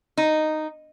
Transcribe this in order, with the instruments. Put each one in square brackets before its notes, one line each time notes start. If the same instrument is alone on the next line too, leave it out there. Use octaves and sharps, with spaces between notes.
[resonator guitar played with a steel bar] D#4